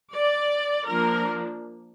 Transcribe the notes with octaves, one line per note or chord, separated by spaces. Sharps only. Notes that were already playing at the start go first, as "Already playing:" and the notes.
D5
F3 A#3 D4 A#4